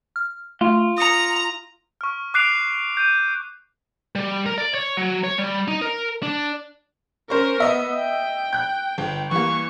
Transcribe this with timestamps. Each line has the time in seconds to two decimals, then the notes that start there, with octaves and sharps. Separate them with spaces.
0.16 F6
0.61 A3 F4
0.98 A#5 D#6 C#7
2.01 C#6 F6
2.34 D6 F#6 C7 D7 F7
2.97 G6 D#7
4.16 G3
4.46 A#4
4.58 D5
4.74 C#5
4.97 F#3
5.24 C#5
5.38 G3
5.68 D#4
5.82 A#4
6.23 D4
7.30 C#4 A#4 C5 C#6
7.60 B3 D#5 E5
7.97 G5
8.53 F#6 G6
8.98 G1
9.31 E3 G3 A#3 C#6